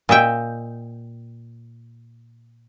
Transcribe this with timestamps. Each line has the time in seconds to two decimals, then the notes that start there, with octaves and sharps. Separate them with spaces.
0.09 A#2 D#5 E5 G5